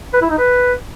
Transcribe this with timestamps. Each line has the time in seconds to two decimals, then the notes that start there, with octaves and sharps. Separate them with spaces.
0.14 B4
0.22 E4
0.30 D#4
0.39 B4